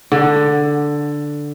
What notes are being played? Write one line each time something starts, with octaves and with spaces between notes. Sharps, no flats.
D3